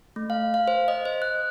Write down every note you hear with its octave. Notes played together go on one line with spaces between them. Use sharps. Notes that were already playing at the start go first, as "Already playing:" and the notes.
A3
F5
F5
C5
D#5
C5
F#6